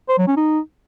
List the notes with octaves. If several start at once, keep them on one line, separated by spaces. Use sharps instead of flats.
C5
F#3
C#4
D#4